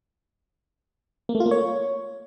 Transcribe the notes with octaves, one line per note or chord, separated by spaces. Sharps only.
A#3
A3
F4
A#3
C#5